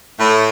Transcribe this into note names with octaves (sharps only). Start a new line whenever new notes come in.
A2